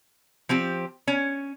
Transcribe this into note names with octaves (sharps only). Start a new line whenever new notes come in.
F3 C4 G4
C#4